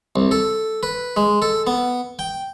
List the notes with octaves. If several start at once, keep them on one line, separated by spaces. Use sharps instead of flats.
C2
A4
B4
G#3
A4
B3
G5